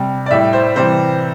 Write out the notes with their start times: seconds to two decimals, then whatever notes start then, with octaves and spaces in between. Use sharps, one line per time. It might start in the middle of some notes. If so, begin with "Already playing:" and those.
Already playing: C3 G3
0.26 D5
0.31 A2 G3 E5
0.53 C5
0.76 C3 E3 G3 C5